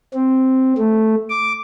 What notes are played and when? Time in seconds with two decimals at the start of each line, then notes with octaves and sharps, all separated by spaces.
0.14 C4
0.78 A3
1.29 D6